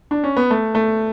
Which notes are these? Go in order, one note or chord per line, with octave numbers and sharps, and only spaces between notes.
D4
C#4
B3
A3
A3